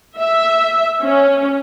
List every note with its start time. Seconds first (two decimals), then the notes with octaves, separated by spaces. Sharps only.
0.18 E5
1.03 C#4